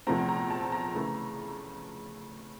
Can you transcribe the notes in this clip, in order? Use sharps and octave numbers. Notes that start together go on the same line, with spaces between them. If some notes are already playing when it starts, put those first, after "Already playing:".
E2 C3 F3 A3 C4 A#5
A#5
A5
A#5
C#3 E3 A3